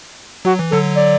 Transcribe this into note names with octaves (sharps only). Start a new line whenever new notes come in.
F#3 F#4
E3
D3 F#3 A4
D5